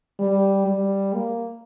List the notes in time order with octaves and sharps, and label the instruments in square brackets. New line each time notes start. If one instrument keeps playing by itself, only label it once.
[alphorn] G3
G3
A#3